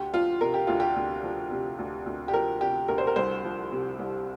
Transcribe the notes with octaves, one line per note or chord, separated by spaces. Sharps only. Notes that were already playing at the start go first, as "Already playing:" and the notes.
Already playing: D2 G4
F3 F4
C3 A#4
G4
D2 F4
G4
D2
F3
C3
D2
D2
G4
F3 A#4
C3 G4
D2 A#4
C5
A#4
C2 C5
F3
C3
C2